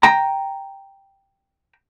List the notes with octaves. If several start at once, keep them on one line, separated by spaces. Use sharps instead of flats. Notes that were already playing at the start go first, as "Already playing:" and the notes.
G5 A#5